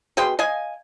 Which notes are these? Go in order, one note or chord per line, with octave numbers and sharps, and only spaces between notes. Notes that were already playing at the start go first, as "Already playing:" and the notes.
B2 G#4 G5 C6
D#5 F5 G#5